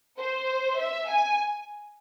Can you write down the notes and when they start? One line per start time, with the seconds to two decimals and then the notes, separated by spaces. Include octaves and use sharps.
0.19 C5
0.80 E5
1.09 G#5